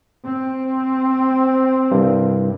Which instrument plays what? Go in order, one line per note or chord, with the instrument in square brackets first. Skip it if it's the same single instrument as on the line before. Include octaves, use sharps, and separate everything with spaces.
[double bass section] C4
[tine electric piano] C2 G2